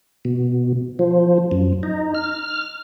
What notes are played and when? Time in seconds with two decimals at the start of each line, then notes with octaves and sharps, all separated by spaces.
0.25 B2
0.99 F3
1.51 F#2
1.83 D#4
2.14 F6